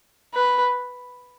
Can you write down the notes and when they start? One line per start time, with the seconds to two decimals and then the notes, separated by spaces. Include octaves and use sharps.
0.34 B4